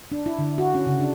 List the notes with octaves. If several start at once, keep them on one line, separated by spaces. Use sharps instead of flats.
D4
E4
D3
F#4
C#4
C#3
D4